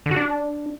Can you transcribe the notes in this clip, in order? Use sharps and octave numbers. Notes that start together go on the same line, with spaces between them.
D3
F#4
D4